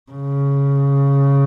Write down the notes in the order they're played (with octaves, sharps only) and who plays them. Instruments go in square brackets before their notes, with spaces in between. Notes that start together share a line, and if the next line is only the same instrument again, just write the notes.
[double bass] C#3